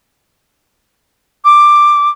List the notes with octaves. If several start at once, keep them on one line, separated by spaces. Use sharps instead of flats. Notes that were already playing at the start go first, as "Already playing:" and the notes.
D6